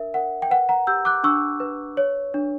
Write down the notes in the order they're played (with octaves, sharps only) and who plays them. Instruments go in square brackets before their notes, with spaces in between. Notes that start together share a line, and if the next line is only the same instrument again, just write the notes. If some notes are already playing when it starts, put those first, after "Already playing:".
Already playing: [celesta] D4 A#4 E5
A#4 F#5
G5
B4 F#5
F#5 A#5
G4 E6 G6
D6 F#6
D4 C#6 E6
B4
C#5
D4